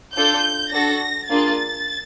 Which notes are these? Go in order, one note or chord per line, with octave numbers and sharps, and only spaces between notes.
D4 F4 A4 G6
D4 F#4 A4 A#6
A#3 D4 F4 G#4 A6